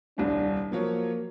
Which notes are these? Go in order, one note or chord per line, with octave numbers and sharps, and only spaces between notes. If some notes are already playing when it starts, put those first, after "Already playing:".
D#1 C2 D4
F3 F#3 A#3 C#5